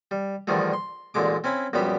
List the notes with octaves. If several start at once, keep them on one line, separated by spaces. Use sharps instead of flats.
G3
E2 D3 D#3 F3 G3 A3
C6
A1 A#2 D3 G#3 D6
C4 C#4 E4 B5
A#1 F#2 G3 B3 G4 B5